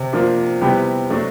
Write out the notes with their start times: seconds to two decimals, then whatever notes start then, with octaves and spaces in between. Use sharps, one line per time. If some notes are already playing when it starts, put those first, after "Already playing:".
Already playing: C3
0.13 F3 A#3 D4
0.61 C3 G3 B3 E4 G4
1.10 F#3 A3 D4